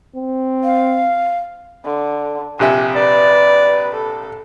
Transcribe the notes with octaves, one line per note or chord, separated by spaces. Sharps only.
C4
F5
D3
A#1 C3 E5 G#5
B4 D5
A4